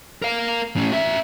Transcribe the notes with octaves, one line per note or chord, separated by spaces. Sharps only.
A#4 F5
A2 C#4
F#4 E5